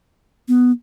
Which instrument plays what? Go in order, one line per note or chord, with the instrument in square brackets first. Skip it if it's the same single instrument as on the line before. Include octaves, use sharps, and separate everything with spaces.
[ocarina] B3